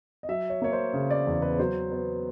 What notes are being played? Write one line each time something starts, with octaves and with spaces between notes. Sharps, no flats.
D#5
F#3 E5
C#5
A#3 C#5
C5
C#3
D5
E2
B4
F#3 C5
B3